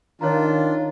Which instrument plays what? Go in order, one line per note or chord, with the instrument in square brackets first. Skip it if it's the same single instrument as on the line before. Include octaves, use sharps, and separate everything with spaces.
[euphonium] D#3 [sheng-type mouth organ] D4 F4 [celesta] C#5 F5 A#5